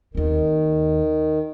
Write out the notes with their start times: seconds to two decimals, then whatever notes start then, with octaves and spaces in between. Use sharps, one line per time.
0.15 D#2 D#3 C4